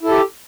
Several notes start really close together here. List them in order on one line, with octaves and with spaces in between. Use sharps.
E4 A4 G4